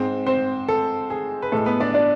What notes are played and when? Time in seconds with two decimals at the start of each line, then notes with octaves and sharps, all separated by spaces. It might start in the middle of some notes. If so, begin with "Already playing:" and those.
Already playing: G#2 G#3 C4 C5
0.26 C4 C5
0.68 A4
1.10 G#4
1.42 B4
1.52 A2 G#3 A4
1.66 B3 B4
1.80 D4 D5
1.94 D4 D5